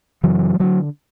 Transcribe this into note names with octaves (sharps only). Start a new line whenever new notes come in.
F#2 C#3 E3 F#3
D3 E3 F#3